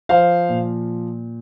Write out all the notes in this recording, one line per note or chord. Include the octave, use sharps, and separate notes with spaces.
F3 C5 F5
A#2